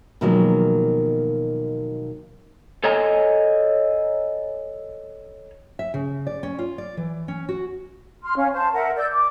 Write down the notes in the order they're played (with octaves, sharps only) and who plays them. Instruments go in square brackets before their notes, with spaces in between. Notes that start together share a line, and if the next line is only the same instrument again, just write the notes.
[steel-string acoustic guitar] B2 D#3 F3 F#3 G#3 A#3
[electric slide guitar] A4 C#5 D#5 G#5 A#5
[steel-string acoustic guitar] E5
C#3
D5
C#4
F4
D5
E3
C#4
F#4
[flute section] C6 F6
C#4 F5
C5 A5
A#4 E5 F#5
D5 E6 G6
D6